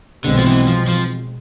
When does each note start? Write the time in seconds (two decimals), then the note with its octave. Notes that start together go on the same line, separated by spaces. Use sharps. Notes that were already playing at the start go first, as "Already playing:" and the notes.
0.25 B1 B2 D3 G#3 C4
0.38 F3
0.46 E3
0.67 F3
0.88 F3